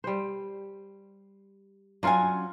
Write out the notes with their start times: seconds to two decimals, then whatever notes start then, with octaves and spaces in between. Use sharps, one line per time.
0.04 G3 C5
2.03 F#3 C#4 D4 F4 G#5